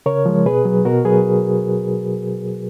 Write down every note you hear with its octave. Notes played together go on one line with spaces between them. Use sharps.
C#3 A#4 C#5
F3 G#3
B2 G#4 B4
F#3
B2 F#4 A#4
F#3 G#4 B4